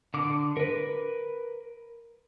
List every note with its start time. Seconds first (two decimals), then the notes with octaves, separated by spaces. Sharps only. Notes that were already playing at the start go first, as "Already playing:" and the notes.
0.14 D3 D6
0.57 A#4 B4